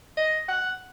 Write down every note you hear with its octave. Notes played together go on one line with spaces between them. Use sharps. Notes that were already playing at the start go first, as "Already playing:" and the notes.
D#5
F#5